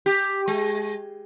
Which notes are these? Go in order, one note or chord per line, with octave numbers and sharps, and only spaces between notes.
G4
G#3